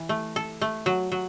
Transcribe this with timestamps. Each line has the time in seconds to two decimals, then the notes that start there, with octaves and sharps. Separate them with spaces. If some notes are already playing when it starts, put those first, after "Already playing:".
Already playing: E3
0.09 A3
0.36 A4
0.61 A3
0.86 F#3
1.12 F#3